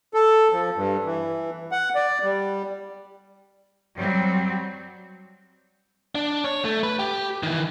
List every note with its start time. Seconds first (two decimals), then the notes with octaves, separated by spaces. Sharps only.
0.14 A4
0.52 F3
0.76 G2
1.05 E3
1.72 F#5
1.95 D5
2.23 G3
3.97 F#3 G3 C4
6.15 D4
6.44 C#5
6.65 A3
6.83 B4
6.99 G4
7.43 D#3 E3